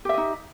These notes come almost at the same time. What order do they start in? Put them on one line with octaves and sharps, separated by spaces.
G4 E5 D#5 D#4